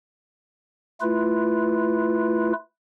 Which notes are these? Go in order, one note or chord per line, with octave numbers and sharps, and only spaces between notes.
A3 E4 F4 B4